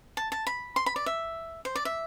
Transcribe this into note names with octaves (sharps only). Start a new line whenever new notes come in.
A5
A5
B5
C6
B5
D5
E5
C5
D5
E5